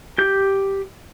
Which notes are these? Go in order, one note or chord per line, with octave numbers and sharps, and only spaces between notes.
G4 G6